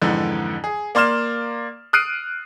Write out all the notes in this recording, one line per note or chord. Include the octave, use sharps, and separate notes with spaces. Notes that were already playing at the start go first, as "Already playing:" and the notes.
F2 G#2 D3 E3
G#4
A#3 D5 C6 F6 E7
D#6 F6 F#6 C7 D7 D#7